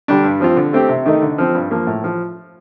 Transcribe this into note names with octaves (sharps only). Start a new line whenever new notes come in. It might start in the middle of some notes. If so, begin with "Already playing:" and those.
D3 G3 D4
G2
F3 C4 F4
D3
A3 C4 G4
C3
D#3 A3 D#4
D3
F3 C4
G2
F3 A#3
A2
F3